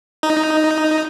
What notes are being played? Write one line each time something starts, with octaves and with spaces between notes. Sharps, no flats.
D#4